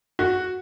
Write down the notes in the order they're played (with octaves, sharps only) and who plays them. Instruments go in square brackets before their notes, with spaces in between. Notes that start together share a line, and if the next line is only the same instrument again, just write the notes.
[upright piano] F#4